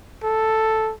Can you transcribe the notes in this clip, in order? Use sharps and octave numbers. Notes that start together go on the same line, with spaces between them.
A4